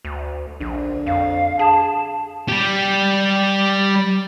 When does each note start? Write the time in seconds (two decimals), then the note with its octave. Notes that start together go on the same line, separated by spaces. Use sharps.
0.05 D2
0.60 A#1 D3
1.06 F2 F5
1.59 G#4 A5
2.49 G3 G4